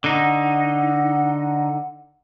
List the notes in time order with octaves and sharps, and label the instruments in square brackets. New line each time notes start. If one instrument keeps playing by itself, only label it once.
[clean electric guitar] D3 D#4 [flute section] F#5